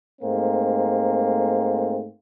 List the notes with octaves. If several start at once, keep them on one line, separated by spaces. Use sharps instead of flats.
G#2 A3 A#3 C4